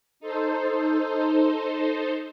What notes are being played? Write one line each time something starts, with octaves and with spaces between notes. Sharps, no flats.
D#4 A4 C5